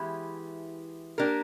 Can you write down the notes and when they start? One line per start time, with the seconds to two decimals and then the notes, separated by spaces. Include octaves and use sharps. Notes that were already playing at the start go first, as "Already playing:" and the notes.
Already playing: E3 G#3 B3 E4 G4
1.18 A#3 D4 G4 A#4